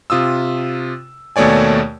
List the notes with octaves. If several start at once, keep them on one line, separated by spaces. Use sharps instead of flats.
C3 F4 D#6 E6
D#2 B2 A3 C#5 D5 G#5